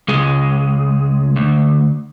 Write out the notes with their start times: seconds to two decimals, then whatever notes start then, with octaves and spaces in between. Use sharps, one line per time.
0.08 C#2 G#3
1.36 D2